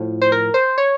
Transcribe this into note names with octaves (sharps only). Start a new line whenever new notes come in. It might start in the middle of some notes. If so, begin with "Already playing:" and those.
Already playing: A2 F3
C5
A#4
C5
C#5